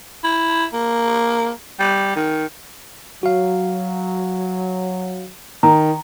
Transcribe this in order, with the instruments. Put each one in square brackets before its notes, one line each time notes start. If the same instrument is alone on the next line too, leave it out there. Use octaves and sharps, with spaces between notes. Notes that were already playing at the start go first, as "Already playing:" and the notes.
[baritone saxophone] E4
A#3
G3
D#3
[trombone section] F#3 [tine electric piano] F#4 F5
[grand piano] D#3 [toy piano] A#5